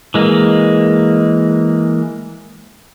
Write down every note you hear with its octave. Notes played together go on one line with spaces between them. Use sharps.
E3 G#3 A#3